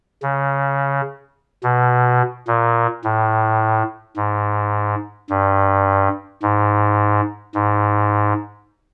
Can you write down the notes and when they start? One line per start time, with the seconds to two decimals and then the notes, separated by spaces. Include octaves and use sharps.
0.22 C#3
1.63 B2
2.48 A#2
3.04 A2
4.16 G#2
5.30 G2
6.42 G#2
7.55 G#2